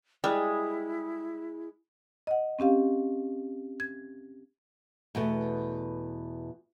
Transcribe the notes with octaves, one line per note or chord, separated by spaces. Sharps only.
G3 G#3 E4
D#5 F#5
C4 C#4 G4 F5
G#6
E2 B2 A3